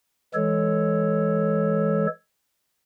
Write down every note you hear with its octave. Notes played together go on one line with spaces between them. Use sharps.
E3 G#3 A4 C#5